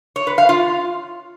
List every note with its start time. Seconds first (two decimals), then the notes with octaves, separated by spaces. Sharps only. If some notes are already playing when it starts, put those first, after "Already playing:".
0.16 C#5
0.27 B4
0.38 F5
0.49 F4